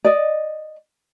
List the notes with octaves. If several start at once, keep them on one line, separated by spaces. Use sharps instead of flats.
D5 D#5